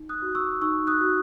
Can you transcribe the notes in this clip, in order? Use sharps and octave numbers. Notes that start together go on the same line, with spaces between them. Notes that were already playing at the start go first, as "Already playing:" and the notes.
Already playing: D#4
D#6 F#6
F#4
C#6 E6
D#4 C#6 E6
D#6 F#6
F#4